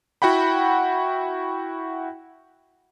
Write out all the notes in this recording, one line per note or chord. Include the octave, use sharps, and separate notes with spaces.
E4 F#4 F#5 G5 B5